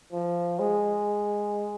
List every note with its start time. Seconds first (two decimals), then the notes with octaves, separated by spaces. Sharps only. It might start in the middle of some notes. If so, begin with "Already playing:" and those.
0.13 F3
0.59 G#3